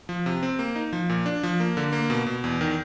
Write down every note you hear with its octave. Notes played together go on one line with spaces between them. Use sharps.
F3
C3
C4
A#3
D#4
F3
A#2
D4
F3
A#3
D3
A#3
B2
B2
E2
D#3